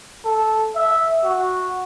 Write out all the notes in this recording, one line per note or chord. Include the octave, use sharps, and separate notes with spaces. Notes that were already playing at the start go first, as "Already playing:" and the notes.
A4
E5
F#4